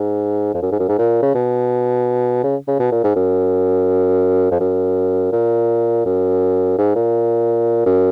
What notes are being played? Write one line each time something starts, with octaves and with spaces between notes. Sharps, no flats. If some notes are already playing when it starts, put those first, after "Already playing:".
Already playing: G#2
F2
F#2
G#2
F#2
G#2
A#2
C#3
B2
C#3
C#3
B2
A#2
G#2
F#2
F2
F#2
A#2
F#2
G#2
A#2
F#2